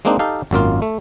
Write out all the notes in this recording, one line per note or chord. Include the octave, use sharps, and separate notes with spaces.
G#3 A#3 C4 D4 D#4
D#4 G4 A4 F5
G#1 F#2 A#3 F4
A3